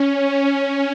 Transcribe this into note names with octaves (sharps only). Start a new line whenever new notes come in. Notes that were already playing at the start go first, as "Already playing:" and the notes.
Already playing: C#4
C#4